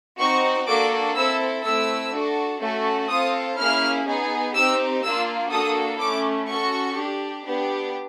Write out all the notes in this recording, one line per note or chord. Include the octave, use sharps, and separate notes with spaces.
C4 D#4 F#4 C#6
A#3 D4 F#4 A4 D6
C4 E4 A4 E6
A3 C4 E4 E6
D4 F#4 A4
A3 C#4 F#4 A4
C4 F4 A4 D#6
A#3 C#4 E4 G#4 F6
B3 D#4 G#4
C4 D#4 G4 E6
A#3 D4 F4 E6
A#3 D4 F#4 A4 D#6
A3 C#4 E4 D6
C#4 F#4 A4 C#6
D4 G4
B3 D4 G4